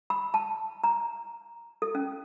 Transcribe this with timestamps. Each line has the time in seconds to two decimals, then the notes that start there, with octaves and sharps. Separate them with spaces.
0.10 B5
0.34 A5
0.84 A#5
1.82 A4
1.95 C#4